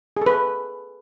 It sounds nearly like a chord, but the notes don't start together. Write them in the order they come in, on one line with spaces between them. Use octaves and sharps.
G#4 A4 B4